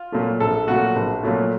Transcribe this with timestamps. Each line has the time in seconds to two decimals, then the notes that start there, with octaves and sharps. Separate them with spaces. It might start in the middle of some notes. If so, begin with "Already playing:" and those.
Already playing: F4
0.12 A#2 F#3 A3
0.40 A#1 A4
0.67 A#2 F#3 A3 F#4
0.96 A#1
1.23 A#2 F#3 A3